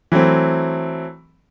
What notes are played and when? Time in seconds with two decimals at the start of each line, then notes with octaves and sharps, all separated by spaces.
0.12 E3 F#3 A3 C4